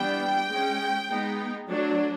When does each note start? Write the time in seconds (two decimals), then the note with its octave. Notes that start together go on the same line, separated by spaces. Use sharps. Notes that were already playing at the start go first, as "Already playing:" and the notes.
Already playing: E3 G3 B3 D4 G5
0.49 G#3 C#4
1.08 G#3 B3 D#4
1.67 F#3 A3 D4